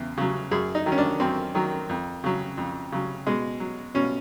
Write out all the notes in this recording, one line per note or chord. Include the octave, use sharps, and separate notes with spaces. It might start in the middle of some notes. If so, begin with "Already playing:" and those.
Already playing: E2 C#3
C#3 F#3
F#2 G#4
D#4
D#3 F#3
C#4
D4
F#2 C4
D#3 F#3
F2
C#3 F#3
F2
C#3 F#3
B2 G#3
F#3
B2 C#4